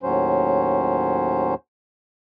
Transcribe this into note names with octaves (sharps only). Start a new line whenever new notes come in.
D#2 A2 F#3 C#4 C5